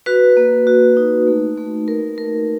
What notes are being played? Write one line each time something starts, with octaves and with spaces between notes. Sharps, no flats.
F#4 B4
A#3
F#4
D#4
A3
A3
A3 A#4
A3 A#4